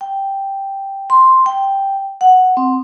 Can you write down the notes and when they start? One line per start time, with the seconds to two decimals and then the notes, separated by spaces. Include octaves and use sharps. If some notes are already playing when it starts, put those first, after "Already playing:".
0.01 G5
1.10 C6
1.46 G5
2.21 F#5
2.57 C4